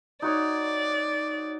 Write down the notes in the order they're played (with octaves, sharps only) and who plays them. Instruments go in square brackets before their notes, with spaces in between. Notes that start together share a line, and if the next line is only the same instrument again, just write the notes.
[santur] D#4 F#4 C#5 [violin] D5